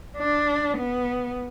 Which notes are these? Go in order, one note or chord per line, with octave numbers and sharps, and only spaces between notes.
D4
B3